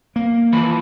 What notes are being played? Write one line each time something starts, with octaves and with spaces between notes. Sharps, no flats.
A#3
E3 F3 B5